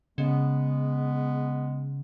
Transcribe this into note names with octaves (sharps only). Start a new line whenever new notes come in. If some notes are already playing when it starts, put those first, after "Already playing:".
C#3 G#3 B3